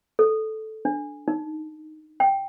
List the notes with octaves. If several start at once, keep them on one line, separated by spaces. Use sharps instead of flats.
A4
D4
D#4
G5